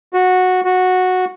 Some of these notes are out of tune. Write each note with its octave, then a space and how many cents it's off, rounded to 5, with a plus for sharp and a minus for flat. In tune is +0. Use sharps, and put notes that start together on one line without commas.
F#4 -10
F#4 -10